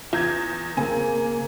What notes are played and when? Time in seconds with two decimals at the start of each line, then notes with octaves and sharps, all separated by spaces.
0.13 E2 F4 E5 G6 G#6
0.77 C#3 A#3 C4 G#5